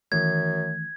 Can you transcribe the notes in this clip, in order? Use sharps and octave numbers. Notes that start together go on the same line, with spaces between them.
F#2 D#3 E3 A3 G#6